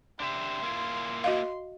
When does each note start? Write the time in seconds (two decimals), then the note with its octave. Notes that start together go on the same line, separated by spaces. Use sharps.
0.20 D4 G4 E5 C6
0.63 A#3 E4 F4
1.24 F#4 D#5 F5